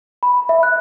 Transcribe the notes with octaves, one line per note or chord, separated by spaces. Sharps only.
B5
E5
F#6